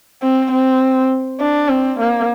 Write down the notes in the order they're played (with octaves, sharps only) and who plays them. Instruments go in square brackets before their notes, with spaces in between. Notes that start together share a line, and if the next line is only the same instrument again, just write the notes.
[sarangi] C4
C4
D4
C4
A#3